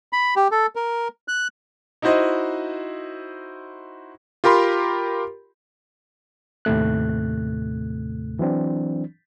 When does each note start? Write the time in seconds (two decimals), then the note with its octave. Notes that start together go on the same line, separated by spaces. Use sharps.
0.13 B5
0.36 G4
0.51 A4
0.76 A#4
1.28 F#6
2.02 D#4 E4 F#4 C5 D#5
4.44 F4 G4 A#4 B5 C6
6.65 D#2 A2 C3 A3 F#6
8.39 E3 F#3 C4 D4